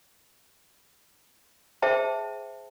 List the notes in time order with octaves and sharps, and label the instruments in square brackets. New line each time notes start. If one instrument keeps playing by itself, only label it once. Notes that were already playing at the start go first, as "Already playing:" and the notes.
[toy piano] G#4 C5 E5 G5 A5